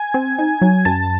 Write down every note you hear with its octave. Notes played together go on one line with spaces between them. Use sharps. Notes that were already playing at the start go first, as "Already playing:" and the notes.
Already playing: G#5 G#6
C4
D#4
F#3
F#2 A5 A6